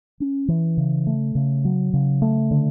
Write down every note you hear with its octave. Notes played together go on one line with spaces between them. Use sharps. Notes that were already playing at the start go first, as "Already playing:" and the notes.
C#4
E3
C#3
A3
C#3
F#3
C#3
A3
D3